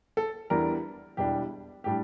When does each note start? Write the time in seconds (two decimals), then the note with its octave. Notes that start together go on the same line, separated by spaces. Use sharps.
0.17 A4
0.50 E2 E3 G3 D4 A#4
1.17 E1 E2 E3 G3 D4 G4
1.84 A2 G3 D4 G4